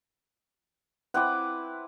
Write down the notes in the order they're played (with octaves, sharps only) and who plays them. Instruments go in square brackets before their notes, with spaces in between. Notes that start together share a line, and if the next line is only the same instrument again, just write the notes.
[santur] C4 E4 B4 [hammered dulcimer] F#5 D6